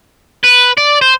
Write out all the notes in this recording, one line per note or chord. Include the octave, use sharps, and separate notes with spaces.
B4
D5
C5